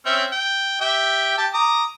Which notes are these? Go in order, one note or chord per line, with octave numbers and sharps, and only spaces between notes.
C4 C#4 E5
G5
G4 E5 G5
G4 A5
A#5 D6 D#6